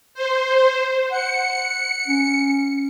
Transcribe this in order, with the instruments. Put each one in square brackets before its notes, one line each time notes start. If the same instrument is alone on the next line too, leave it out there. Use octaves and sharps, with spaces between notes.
[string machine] C5
[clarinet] F#5 [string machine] C#7
[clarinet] C#4